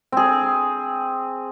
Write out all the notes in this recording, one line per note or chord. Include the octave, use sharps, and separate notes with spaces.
C4 G#4